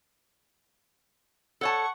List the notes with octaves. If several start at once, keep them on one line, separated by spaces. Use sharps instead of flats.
A4 C#5 F#5 A5 C#6